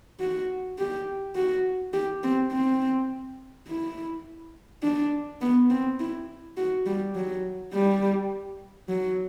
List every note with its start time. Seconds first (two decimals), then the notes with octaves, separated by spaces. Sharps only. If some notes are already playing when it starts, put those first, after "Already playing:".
0.20 F#4
0.78 G4
1.36 F#4
1.93 G4
2.23 C4
2.52 C4
3.68 E4
4.83 D4
5.41 B3
5.70 C4
6.00 E4
6.57 F#4
6.86 G3
7.15 F#3
7.73 G3
8.89 F#3